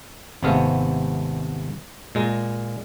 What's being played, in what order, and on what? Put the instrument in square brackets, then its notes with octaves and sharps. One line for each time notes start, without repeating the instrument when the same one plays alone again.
[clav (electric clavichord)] G#1 C3 G#3 A3 B3 F5
A#2 G#3 A#5